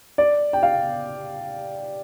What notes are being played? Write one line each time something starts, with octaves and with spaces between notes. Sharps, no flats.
D5
G5
F5